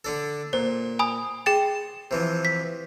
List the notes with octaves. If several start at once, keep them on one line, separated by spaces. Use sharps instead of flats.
D3 D4 A4
A#2 C5
G#5 B5 D#6
G#4 G5 C6 A6
C3 E3 F3
B6